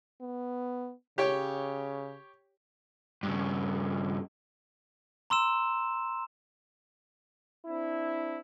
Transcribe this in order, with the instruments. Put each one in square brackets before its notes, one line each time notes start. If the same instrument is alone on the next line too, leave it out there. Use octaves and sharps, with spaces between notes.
[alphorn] B3
[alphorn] C#3 [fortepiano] G4 C#5 G5
[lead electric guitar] G2 C#3
[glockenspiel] A#5 C6 E6 E7
[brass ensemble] C4 D4 E4